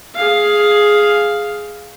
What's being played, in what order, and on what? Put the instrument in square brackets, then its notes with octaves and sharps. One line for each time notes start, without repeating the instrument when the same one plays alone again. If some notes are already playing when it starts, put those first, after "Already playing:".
[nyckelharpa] G#4 F5